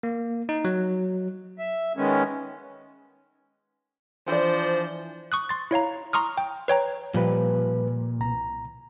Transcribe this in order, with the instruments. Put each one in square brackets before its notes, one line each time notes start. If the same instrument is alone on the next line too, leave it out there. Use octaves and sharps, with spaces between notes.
[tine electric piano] A#3
D#4
F#3
[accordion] E5
D#3 G#3 B3 C#4
[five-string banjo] E3 D5 [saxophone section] F3 D4 C5
[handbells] C#6 D#6 F#6
C6 A6
E4 C#5 F5 A#5
A#5 C6 C#6 D#6 F6
G5
B4 C#5 G5 A#5
[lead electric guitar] A#2 [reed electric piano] F3 G3 B4
[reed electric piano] C2 A#5